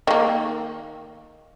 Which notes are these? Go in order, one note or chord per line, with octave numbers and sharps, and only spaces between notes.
D#3 A#3